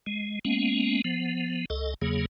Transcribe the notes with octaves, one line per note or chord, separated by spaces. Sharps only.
G#3
G#3 A#3 B3 C#4
F3 B3
C#2 A4 D#5
E2 C#3 F#3 A#3 G#4